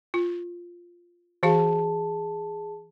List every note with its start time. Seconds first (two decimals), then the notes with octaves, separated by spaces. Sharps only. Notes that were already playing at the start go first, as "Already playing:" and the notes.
0.14 F4
1.43 E3 F#4 G#4 F5 A5